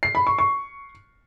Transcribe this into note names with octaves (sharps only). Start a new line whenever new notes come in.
C7
B5
C#6
C#6